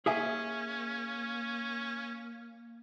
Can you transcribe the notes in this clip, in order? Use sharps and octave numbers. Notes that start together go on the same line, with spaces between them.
A#3 C#4 G#4 E5 G#5